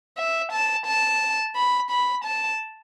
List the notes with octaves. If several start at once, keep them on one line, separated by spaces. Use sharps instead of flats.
E5
A5
A5
B5
B5
A5